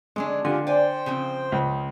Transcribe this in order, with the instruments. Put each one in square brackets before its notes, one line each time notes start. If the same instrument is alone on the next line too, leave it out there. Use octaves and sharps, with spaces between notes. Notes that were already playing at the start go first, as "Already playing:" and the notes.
[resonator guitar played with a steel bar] D3 C#4 D4 [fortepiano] G#3
[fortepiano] D3 [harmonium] F4 G4 [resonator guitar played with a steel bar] G#5
[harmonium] C5 G5 [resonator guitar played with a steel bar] D5 G#5
[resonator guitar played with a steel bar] C#3 F3 C4
[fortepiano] C#2